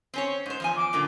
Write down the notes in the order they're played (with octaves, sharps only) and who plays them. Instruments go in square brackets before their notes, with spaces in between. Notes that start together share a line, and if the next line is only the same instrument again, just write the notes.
[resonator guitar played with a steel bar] C4 C#4 C#5
G#2 C5
E2 F3 G#5
[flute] D6
[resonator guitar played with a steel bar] F#2 A#2 D3